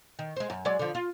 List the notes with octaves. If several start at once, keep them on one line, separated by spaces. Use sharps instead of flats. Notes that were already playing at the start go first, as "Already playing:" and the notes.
D#3
G#3 C5
F#2
F#3 G#3 D5
D3 F3
F4